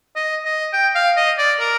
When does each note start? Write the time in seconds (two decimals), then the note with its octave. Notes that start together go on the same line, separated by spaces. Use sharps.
0.16 D#5
0.45 D#5
0.73 G5
0.95 F5
1.17 D#5
1.38 D5
1.60 A#4